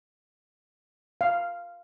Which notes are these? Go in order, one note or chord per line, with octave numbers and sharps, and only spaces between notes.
F5